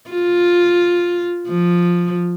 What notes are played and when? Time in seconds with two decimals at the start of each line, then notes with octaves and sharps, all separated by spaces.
0.10 F4
1.48 F3